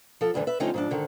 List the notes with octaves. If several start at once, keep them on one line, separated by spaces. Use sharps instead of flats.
F3 A4
D2 G2 D3 E3
B4 E5
D3 F3 A3 C4 C#4 D#4
G#2 F3 D4
G#2 D3 D#3